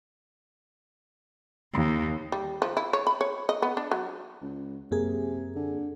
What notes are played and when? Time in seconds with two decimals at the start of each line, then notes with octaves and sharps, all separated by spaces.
1.73 D#2
2.32 G3
2.62 F3
2.77 E4
2.93 C#5
3.07 B5
3.21 C#5
3.49 D#5
3.62 B3
3.77 D4
3.91 F#3
4.42 C#2
4.91 F#2 C3 A#3 G#4
5.56 D3